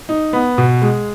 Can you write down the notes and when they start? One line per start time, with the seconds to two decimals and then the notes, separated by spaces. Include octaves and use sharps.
0.09 D#4
0.33 B3
0.58 B2
0.82 G#3